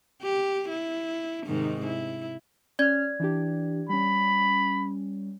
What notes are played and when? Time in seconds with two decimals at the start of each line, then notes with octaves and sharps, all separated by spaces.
0.22 G4
0.69 E4
1.46 G#2 C3 D#3
1.86 E4
2.79 C#4 D5 F6 G#6
3.19 E3 D4 G4
3.89 G3 C#4 B5